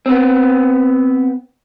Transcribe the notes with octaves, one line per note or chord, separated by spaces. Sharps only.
B3 C4